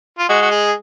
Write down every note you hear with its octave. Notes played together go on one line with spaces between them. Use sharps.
F4
G#3 F#4
F#4
G#4